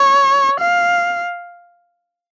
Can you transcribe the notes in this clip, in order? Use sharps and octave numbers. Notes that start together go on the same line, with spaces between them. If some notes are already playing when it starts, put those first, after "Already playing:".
Already playing: C#5
F5